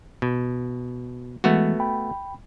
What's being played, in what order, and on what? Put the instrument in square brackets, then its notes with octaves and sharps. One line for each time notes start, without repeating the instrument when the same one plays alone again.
[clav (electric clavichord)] B2
[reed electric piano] E3 G#3 [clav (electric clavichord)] A3 B3 F#4
[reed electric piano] G5 B5